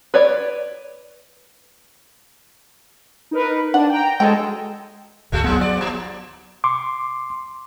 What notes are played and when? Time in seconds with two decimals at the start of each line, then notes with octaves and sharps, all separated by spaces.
0.14 B4 C#5 D5
3.31 D#4 A#4 B4
3.74 D4 F#5
3.89 G5 A#5
4.20 F#3 G#3 F#4 A4 G5
5.32 G#1 D2 G#3 A3 F#4
5.44 G2 F#3 G#3 B3
5.61 D5
5.77 G#2 F3
6.64 C6 D6